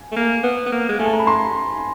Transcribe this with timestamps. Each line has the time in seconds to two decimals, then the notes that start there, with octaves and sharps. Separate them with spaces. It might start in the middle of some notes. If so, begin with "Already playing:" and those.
Already playing: G#5
0.12 A3
0.16 A#3
0.43 B3
0.66 B3
0.72 A#3
0.89 G#3
0.99 A3 G#5
1.06 A5
1.13 A#5
1.19 B5
1.26 A3 A#5 C6